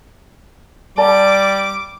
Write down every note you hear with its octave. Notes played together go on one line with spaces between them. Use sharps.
G3 D5 A5 A#5 D6